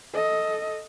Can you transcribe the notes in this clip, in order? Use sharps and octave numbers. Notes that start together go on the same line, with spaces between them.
A4 D#5